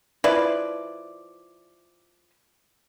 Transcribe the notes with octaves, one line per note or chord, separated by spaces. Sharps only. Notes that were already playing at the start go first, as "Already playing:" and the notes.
F3 E4 B4 D5